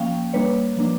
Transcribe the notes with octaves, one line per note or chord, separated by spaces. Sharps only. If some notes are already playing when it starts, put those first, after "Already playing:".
Already playing: F3 A#3 C#4 F5 G5
G3 A#3 D4 B4 C#5
F3 A#3 D4